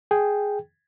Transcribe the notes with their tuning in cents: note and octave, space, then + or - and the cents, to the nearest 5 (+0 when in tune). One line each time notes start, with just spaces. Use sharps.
G#4 +0 G5 +0